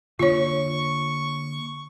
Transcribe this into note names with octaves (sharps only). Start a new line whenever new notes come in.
D3 A#3 D4 F4 C#5 C#6